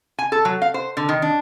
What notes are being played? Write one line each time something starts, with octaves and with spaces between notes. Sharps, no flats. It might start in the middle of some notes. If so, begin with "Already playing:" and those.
G#5
A4
F#3
F5
C5
D3
D#3
D4